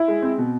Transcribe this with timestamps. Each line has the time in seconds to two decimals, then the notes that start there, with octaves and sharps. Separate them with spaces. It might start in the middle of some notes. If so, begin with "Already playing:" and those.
Already playing: E4
0.08 G#3
0.23 C4
0.38 B2